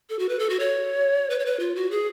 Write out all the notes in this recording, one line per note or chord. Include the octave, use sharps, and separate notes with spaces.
A4
F#4
B4
A4
F#4
C#5
B4
C#5
B4
F4
F#4
G#4